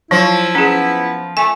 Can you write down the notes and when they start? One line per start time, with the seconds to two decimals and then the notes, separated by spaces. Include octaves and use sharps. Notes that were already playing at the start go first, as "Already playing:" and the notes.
0.11 F3 F#3 E4
0.55 B3 C#4 G#4
1.37 A3 G#5